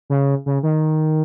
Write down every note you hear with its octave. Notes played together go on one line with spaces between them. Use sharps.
C#3
C#3
D#3